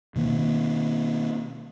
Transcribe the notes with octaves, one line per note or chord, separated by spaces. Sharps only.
B2 D#3 A#3